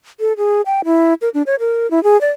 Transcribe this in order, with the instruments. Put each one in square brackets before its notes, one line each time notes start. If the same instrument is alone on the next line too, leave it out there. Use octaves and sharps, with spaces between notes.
[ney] A4
G#4
G5
E4
A#4
D4
C#5
A#4
E4
G#4
D5